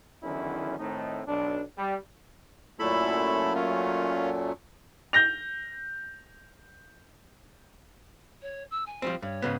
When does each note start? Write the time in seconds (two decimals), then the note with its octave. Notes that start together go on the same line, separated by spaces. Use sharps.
0.23 E2 D3 D#3 F#3 C#4 E4
0.78 A2 D#3 A3 C4 D#4
1.27 B1 D4
1.78 G3
2.79 F#2 A#2 A3 E4 A4 B5
3.55 C#4 F4
5.13 G6 A#6 F7
8.42 C#5
8.70 E6
8.86 G#5
9.02 F3 G3 C4
9.22 G2 C#5
9.42 G#2 C#3 B3